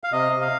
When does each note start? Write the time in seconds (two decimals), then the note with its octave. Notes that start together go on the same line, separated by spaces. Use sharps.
0.04 F5
0.12 C3 D#5
0.32 C3
0.41 F5